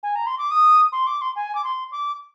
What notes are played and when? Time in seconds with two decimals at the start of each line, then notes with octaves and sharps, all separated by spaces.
0.03 G#5
0.15 A#5
0.26 C6
0.38 D6
0.51 D#6
0.92 C6
1.07 D6
1.21 C6
1.35 G#5
1.55 D6
1.64 C6
1.92 D6